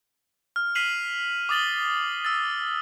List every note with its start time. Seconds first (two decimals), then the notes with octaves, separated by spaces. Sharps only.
0.56 F6
0.75 F6 B6 C7 D#7 F7 F#7
1.49 D6 D#6 A6 F#7 G7
2.24 E6 A6